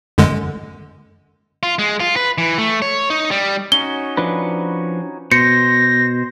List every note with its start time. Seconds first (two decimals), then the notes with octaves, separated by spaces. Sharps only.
0.18 F#2 D3 G#3
1.63 F4
1.79 G#3
2.00 F4
2.16 B4
2.38 E3
2.58 A3
2.82 C#5
3.10 D#4
3.31 G3
3.72 C#4 D#4 F#4 G7
4.17 F3 D4 B4
5.32 B2 C5 A#6 C#7